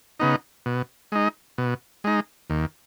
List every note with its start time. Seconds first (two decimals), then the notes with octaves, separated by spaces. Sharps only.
0.20 C#3 B3 D#4
0.66 B2
1.12 G#3 D#4
1.58 B2
2.04 G#3 D#4
2.50 D#2